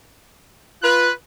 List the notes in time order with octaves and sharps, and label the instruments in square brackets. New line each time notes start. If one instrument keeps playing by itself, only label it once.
[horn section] F4 B4 [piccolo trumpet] F#6